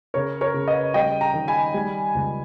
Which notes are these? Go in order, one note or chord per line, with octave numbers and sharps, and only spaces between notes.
C#3 A#4 C#5
A#4 C#5
C#3
B4 D#5
G3 D#5 G5
G5 A#5
D#3
G#5 B5
G3
C#2